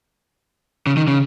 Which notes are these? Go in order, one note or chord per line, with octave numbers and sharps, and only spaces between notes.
C#3
D#3
C#3